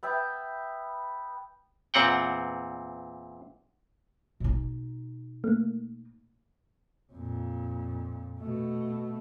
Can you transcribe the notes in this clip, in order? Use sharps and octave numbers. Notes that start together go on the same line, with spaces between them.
B3 E5 G5
E2 A#2 C4 F#5 G5
B2 D#4
A3 A#3
F2 A#2
B2 A3